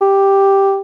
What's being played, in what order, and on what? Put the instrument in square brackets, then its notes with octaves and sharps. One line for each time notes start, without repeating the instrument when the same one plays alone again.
[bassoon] G4